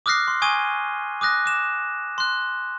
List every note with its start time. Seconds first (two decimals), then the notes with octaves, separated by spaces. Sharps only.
0.06 D6 D#6 F6 F#6 A#6 C7
0.28 C6
0.42 G#5 C#6 D#6 G#6 D#7 G7
1.21 D6 D#6 F#6 A#6
1.46 D6 E7
2.18 C6 F#6